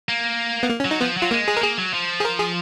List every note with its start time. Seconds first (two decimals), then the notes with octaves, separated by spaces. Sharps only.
0.09 A#3
0.63 B3
0.70 A#3
0.80 C#4
0.85 F#3
0.91 D#4
1.01 F3 B3
1.17 F#3
1.22 F4
1.31 G#3 A#3
1.48 G#4
1.57 A#4
1.62 A#3 G#4
1.78 F#3
1.94 F3
2.20 G#4
2.25 A#4
2.39 G#4